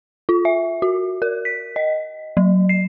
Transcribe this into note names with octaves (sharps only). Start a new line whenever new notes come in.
F4
E5
F#4
A#4
B6
D#5
F#3
C7